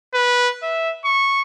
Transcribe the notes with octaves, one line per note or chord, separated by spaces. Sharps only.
B4
E5
C#6